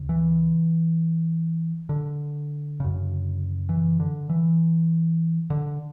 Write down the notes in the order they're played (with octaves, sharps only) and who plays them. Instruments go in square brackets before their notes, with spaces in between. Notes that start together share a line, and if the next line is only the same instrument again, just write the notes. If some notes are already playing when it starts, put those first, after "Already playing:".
Already playing: [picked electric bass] D2 C#3
E3
D3
F#2 C#3
E3
D3
E3
D3